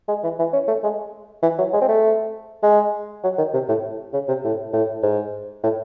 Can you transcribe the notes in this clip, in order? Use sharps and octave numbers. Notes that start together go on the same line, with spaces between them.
G#3
E3
E3
C#4
A3
G#3
E3
F#3
G#3
C4
A3
G#3
F#3
D#3
C3
A2
C#3
C3
A2
A2
G#2
A2